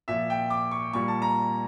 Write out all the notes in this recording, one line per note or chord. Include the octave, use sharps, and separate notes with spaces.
A#2 F3 E5
G5
D6
C#6
A#2 G3 C#6
A5
A#5